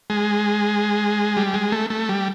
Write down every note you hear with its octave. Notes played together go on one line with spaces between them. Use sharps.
G#3
G3
G#3
A3
A3
G3